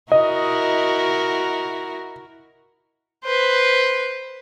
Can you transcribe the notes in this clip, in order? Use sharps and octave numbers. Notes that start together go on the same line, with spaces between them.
E4 F#4 A#4 D#5
B4 C5